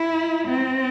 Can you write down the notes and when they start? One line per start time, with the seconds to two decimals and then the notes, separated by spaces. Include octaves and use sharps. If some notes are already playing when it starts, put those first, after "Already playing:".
Already playing: E4
0.48 C4